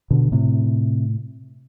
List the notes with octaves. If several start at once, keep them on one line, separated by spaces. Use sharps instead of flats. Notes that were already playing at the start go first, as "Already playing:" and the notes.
B2 D3
A2 C3